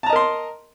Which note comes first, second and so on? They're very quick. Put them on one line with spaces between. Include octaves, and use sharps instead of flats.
A5 A#5 D#5 A#4 C6